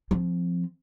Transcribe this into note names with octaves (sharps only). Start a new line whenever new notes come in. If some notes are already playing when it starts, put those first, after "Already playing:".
F3 C4